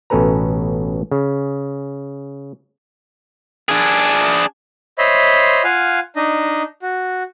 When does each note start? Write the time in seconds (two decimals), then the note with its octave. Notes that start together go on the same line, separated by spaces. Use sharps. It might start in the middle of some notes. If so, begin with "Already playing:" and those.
0.10 A1 B2 C#4 A4 B4 A#5
1.12 C#3
3.69 D4 G#4
4.98 C5 C#5 D#5 E5 B5 C6
5.64 F4 F5 F#5 G#5
6.16 D4 D#4 D#5
6.82 F#4